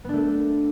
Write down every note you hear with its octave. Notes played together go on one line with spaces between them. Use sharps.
A3 B3 D4 A4